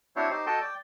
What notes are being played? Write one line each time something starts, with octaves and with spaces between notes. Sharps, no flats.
C4 D4 E4 F#4 C5 C#5
D#4 G4 C5
F#4 A4 D#5 G5 A5
D5 G5